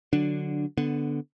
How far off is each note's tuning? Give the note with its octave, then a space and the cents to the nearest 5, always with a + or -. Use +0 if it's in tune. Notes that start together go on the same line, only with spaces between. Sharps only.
D3 +10 F#3 -10 D4 +0
D3 +0 B3 +0